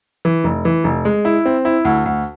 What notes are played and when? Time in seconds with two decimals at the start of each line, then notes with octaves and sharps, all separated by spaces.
0.25 E3
0.44 F1
0.65 E3
0.84 F1
1.05 G#3
1.25 E4
1.46 C4
1.65 E4
1.85 D2
2.06 D2